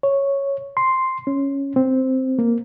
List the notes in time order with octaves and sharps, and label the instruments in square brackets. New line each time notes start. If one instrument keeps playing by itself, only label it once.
[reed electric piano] C#5
C6
C#4
C4
A#3